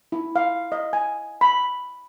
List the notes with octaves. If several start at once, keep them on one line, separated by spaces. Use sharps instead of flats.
E4
F5
D#5
G#5
B5